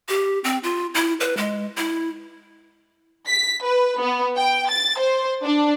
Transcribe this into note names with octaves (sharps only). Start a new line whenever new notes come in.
G4
C4
F4
E4
B4
G#3
E4
B6
B4
B3
G5
A6
C5
D4